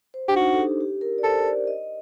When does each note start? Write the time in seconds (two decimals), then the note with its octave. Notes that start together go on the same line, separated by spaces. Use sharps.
0.14 C5
0.28 D4 G4
0.36 D#4 F#4
0.53 A4
0.58 G4
0.80 G4
1.01 A#4
1.18 D5
1.23 A4 C5
1.46 D5
1.67 D#5